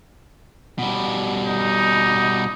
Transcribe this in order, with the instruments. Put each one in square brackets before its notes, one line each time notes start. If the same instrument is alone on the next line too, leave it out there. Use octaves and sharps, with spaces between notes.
[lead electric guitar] B2 G3
[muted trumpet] D#4